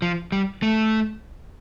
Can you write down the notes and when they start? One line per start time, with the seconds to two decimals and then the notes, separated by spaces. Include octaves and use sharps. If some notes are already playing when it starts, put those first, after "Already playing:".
0.02 F3
0.32 G3
0.63 A3